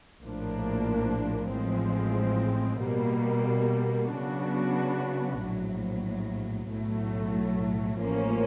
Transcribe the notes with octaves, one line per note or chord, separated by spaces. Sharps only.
A#1 A2 F3 A#3 D4
A1 A2 F3 G#3 C4
B2 G3 A#3
C#3 F#3 B3 D4 F#4
A#1 A2 F#3
B1 A2 F#3 A3
A1 A2 F3 A#3 C#4